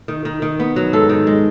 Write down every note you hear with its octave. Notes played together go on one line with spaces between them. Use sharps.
D#3
D#3
D#3
B3
F#3
G#2 A4
D#3
G#3